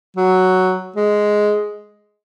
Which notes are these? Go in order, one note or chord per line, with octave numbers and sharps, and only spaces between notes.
F#3
G#3